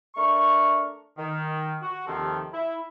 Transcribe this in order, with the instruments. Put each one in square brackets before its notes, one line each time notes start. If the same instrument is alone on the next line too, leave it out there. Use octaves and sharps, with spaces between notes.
[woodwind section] A3 D4 A#4 C#6
D#3
F#4
D#2 C3 D#3 F3 C4 A4
E4